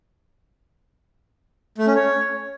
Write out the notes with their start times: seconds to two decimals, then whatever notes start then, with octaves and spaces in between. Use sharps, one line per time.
1.78 A3
1.87 C#4
1.96 C#5